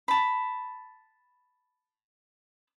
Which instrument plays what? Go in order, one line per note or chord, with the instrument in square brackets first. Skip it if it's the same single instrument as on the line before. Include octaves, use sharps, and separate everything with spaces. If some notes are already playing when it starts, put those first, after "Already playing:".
[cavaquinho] A5 B5